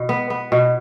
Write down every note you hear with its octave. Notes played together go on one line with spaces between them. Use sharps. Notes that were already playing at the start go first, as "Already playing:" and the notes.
Already playing: B2
B3
B3
B2